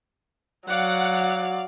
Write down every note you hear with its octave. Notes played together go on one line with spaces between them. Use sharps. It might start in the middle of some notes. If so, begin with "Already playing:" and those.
F#3 D5 F5 F#5